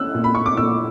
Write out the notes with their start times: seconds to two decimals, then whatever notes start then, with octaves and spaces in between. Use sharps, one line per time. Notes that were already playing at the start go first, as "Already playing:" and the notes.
Already playing: C#4 E6 F#6
0.14 A#2
0.24 B5
0.35 C#6
0.46 D6
0.57 A#2 E6